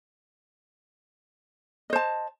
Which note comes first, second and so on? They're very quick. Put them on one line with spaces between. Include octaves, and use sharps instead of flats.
D#5 C5 A5